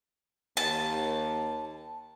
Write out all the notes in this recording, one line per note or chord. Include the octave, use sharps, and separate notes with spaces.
D#2 A5